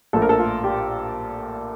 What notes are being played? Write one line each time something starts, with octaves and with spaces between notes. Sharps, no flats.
A#1 A#2 A3 A4
A#4
A4
F4
G4